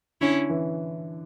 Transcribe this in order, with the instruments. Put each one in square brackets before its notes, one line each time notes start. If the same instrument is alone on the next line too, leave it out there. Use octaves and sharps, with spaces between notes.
[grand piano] D3 [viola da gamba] C#4 E4
[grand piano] E3